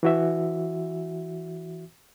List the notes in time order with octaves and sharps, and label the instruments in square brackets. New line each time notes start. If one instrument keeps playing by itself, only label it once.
[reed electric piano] E3 F#4 E5